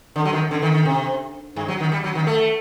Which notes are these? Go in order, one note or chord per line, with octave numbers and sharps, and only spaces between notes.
D3
F#3
D#3
D3
D#3
D#3
C3
G2
F#3
D#3
G3
F#3
D#3
A3